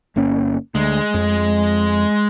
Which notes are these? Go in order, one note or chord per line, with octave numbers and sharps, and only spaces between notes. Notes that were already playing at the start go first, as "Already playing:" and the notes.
G1 A#3 C#4
D2 G#3
F2